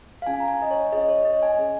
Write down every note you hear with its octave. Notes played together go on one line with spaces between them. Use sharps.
F5
C#4 F4 G#4 G#5
A#5
G#5
D#5
C#5
C#4 F4 G#4 D#5
C#5
D#5
G#5
C#4 G#4